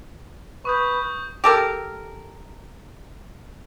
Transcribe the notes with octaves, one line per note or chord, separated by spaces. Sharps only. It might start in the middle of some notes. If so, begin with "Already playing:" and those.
B4 C#6 D#6 G6
G4 A4 A#4